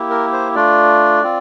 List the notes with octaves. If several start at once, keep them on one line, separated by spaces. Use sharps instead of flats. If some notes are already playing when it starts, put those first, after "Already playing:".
Already playing: A#3 E4 G4
A#4
C5
A3 D4 F4 D5
C4 F4